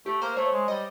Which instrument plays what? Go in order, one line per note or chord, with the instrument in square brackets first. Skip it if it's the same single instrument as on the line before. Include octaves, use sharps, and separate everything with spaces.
[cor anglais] A3 [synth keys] G4
[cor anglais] A#3 [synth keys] C5
[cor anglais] A3 [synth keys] C#5
[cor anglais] G#3
[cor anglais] G3 [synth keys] D#5